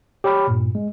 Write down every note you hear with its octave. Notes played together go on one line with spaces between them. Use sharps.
G4 C#5 G5 B5 F6
G2 A#2
G#3